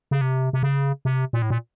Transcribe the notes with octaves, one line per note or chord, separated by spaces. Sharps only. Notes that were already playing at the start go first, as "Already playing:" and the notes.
C#3
C3
C3
C#3
C3
A#2
A2
A#2